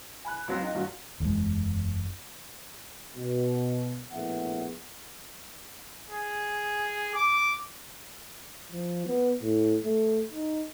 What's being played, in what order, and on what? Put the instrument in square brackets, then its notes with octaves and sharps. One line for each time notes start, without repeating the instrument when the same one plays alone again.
[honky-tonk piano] G#5 B5 F#6
C#2 F#3 C4 A#6
D#4 F4 G5
G#1 G2 F4 F#4
[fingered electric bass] F#1 E2 C#3 G#3
[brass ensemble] B2
A#1 A2 B3 G#4 E5 F#5
[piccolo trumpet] G#4
D6
[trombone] F3
B3
A2
A3
D#4